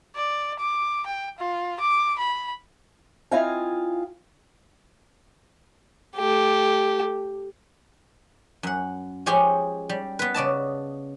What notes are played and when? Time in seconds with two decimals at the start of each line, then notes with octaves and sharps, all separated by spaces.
0.16 D5
0.59 D6
1.06 G5
1.38 F4
1.80 D6
2.19 B5
3.31 C4 E4 F4 D#5 F5 G#5
6.16 A3 G4
8.63 F#2 F#5
9.26 F3 G#3 C#4 G4 G#4
9.89 G3
10.19 B3 B4
10.34 C#3 D5 D#5 A5